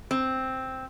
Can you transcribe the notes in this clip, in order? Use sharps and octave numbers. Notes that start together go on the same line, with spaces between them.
C4